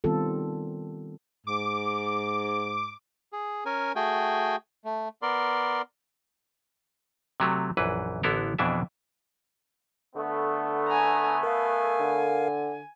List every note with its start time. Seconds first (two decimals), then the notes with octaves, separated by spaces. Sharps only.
0.04 D#3 G3 B3 C4 F4 A4
1.47 G#2 D6
3.33 G#4
3.66 C#4 A#4 G#5
3.96 A3 F#4 G#4 G5 G#5
4.85 A3
5.22 B3 A#4 D5 C6
7.40 C3 F#3 A3
7.77 A#1 F#2 E3 B4
8.23 A1 D3 B3 E4 A4 A#4
8.59 F2 B2 E3 D4 E4 E5
10.16 D3 A3 B3
10.88 G#5 A#5
11.43 A#4 F5 G#5
12.00 D3